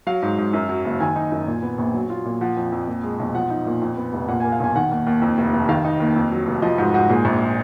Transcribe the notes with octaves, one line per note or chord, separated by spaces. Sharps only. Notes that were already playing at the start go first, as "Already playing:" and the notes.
F#3 F5
G#2
G#2
F#2
F#3
F#1
D#3 G#5
D#4
F#2
A#2
B3
A#1
F#3
F4
A#2
F3 F#5
F2
F2
A#2
G#3
B1
F3 F#5
D#4
A#2
F2
B3
F1
A#2 F#5
G#5
A#3
F5
B1 G#5
D#3 F#5
D#2
D#2
F2
F1
F1
D#3 F5
D#4
D#2
F2
F#3
F1
F3 D#5
G#2 F#4
G#2 F#4
A#2 G#4
A#1